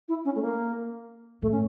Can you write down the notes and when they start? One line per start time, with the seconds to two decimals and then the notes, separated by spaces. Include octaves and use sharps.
0.08 E4
0.25 C#4
0.36 A3
0.42 A#3
1.42 A2 A3
1.52 C#4